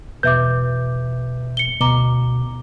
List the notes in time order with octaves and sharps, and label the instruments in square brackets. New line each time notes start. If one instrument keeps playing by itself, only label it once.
[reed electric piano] E2 B2 G6 [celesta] B4 E5 D6
[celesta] C#7 G7
[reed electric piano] D2 B2 [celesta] A#5 D6 G7